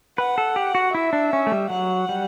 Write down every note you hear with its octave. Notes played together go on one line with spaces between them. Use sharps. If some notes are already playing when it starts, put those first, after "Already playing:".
B4 F#5
A4
G4
F#4
E4 E5
D4
C#4
A3
G3
F#3 F#5
G3